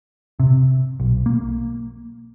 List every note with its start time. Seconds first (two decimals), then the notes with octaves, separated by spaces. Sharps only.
0.40 C3
1.00 B1
1.26 A#3